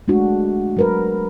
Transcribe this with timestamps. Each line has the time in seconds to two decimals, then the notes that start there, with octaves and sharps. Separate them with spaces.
0.08 G#3 A3 D4 F#4
0.77 F#3 A#4 B4